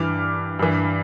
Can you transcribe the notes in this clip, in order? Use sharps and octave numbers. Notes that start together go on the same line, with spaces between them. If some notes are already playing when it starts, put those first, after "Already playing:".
Already playing: G2 E3 D6 F6
G2 E3